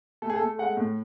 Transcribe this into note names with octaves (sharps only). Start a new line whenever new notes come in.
A3 A4
G#4
A4
A3
G#3 F#5
A2